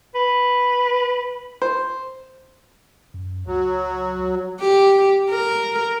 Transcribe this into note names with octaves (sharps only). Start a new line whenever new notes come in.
B4
C5
F#2
C#2 F#3
G4
A#4